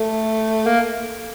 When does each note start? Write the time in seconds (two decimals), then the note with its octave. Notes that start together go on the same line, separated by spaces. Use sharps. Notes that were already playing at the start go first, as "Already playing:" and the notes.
Already playing: A3
0.66 A#3